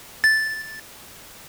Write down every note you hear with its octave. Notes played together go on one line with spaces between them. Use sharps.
A6